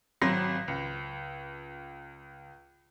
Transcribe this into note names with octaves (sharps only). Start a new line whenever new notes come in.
G#1 F#3 C4 C6 A#6
C#2